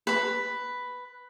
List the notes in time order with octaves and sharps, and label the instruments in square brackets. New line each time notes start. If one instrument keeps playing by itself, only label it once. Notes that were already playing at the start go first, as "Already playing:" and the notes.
[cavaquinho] B4 B5